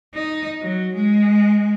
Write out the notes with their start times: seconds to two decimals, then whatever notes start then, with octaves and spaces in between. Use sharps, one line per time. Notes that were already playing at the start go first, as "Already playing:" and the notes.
0.14 D#4
0.62 F#3
0.94 G#3